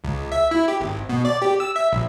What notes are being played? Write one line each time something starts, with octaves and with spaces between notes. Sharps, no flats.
C#2
E5
E4
G4
G#1
B2
D5
G4
E6
E5
A#1